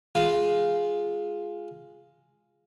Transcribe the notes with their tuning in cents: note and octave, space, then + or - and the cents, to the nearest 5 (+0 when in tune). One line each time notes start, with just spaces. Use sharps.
G#3 +0 F4 +0 F5 +0